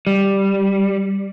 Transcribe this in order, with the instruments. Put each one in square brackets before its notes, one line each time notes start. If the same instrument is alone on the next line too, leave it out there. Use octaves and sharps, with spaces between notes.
[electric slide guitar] G3